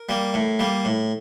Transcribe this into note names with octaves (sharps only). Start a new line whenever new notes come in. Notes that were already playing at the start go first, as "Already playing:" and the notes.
Already playing: A#4
G3 A#3
A2
G3 A#3
A2